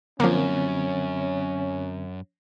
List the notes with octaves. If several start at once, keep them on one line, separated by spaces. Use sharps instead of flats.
F#2 D3 F3 A#3 C4 C#4